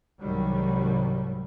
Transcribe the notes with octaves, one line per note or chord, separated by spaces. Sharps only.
C2 G#2 D#3 F#3 G3